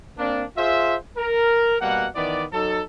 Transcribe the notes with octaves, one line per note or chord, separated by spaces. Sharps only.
A#3 C4 D4
F4 G#4 C5 E5
A#4
B2 G3 A#3 F#5
D#3 E3 B3 D5
F#3 D#4 A4